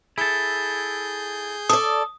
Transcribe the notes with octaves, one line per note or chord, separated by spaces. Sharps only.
E4 G#4 A4 G6
A4 D5 D#6